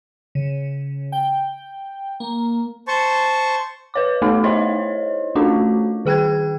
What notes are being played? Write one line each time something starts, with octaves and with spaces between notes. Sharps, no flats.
C#3
G5
A#3
C5 A5 C#6
B4 C#5 D6
A3 B3 D#4 A4
E4 C5 C#5 D#5
A3 C#4 D4 F4 F#4
D#3 G#4 G5 F#6 G#6